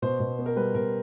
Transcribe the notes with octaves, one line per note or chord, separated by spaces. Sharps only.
B2 C5
B2
B3
A#4
G3 B4
B2 A#4